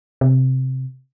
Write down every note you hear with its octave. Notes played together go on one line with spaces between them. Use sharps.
C3